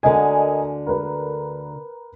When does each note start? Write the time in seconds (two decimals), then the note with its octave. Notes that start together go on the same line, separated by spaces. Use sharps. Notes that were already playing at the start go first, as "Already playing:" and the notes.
0.03 D2 D3 A#4 D#5 G#5
0.87 A#4 B4